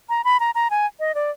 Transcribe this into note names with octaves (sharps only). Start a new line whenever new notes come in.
A#5
B5
A#5
A#5
G#5
D#5
D5